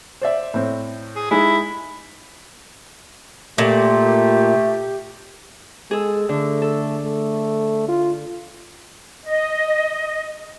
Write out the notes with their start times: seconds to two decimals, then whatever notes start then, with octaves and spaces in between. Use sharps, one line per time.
0.21 C5 D5 E5
0.54 A2 C4
1.16 G#4
1.31 G#3 D#4 E4 G#4
3.58 A#2 A3 G4
5.91 G#3 G#4 A4
6.29 D3 A3
6.62 A4
7.04 A3
7.88 F4
9.24 D#5